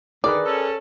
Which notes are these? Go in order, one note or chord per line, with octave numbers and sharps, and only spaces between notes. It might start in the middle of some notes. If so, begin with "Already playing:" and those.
D3 D#3 G#4 A#4 B4 D5
C#4 A4